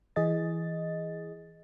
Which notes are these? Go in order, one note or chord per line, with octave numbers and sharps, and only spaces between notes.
E3 G#4 D#5 A6